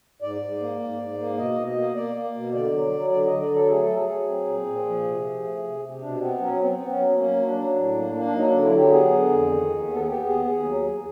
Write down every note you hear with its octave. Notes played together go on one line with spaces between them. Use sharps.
G#2 D5
G#2
A#3
G#2
G#2
A#3
B2 D#5
B2
D#5
A#3
A#3 D5
A#3
B2
D3 D5
F#3
F#3
D3 D5
D#5
D3
D5
F#3 A4
A3 G#4
A4
F#3
G#4
F#3
C4
A#2
A#2
F3
C3
F3
A3
C3
C3
B2 D4
B3 C4
F#3 C#4
B3 C4
B3
C#4
F#3
A#3 C#4
F#3
D4
F#3
A2
A#3
A#3
D4
F#3 D#4
D3 D4
E4
F#3 G4
B3 G#4
D3
F2
D#3
D#2
B3 A4
G#4
B3 G4
D#2 G#4
D#2 G#4
F#3
E2